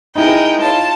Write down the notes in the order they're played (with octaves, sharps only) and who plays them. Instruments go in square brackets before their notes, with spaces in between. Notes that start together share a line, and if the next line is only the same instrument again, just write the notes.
[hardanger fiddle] G#3 A#4 [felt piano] D#4 E4 [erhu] G5
[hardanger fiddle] F4 C#5 [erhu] A5